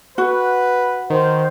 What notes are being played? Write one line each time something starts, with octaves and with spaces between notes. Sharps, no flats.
F#4 B4
D#3 C5